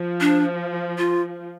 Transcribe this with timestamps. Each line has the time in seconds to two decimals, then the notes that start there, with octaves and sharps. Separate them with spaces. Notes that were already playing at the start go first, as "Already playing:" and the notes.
Already playing: F3
0.21 D4
0.98 F4